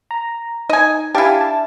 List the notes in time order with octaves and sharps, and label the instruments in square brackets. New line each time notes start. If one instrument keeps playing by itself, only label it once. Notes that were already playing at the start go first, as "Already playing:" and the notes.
[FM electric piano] A#5
[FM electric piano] D#4 [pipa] D#5 G#5
[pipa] D4 E4 [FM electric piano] G4 F5 G#5
[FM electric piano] A5